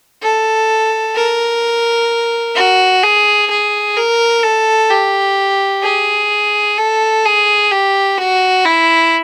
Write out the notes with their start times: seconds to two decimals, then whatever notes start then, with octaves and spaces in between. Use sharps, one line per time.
0.23 A4
1.15 A#4
2.55 F#4
3.04 G#4
3.50 G#4
3.96 A#4
4.43 A4
4.90 G4
5.83 G#4
6.78 A4
7.25 G#4
7.71 G4
8.17 F#4
8.65 E4